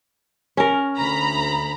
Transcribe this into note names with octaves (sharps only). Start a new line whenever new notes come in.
C#4 A#4
D2 A#5 B5